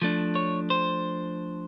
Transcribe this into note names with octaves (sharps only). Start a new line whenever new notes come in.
F3 A3 D4
C#5
C5